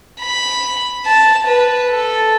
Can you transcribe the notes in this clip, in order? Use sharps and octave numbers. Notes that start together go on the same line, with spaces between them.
B5
A5
B4
A4